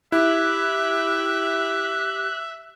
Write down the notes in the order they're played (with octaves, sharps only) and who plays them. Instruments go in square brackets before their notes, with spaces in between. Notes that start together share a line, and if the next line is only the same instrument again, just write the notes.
[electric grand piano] E4 [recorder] G4 [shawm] E5 [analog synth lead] F#6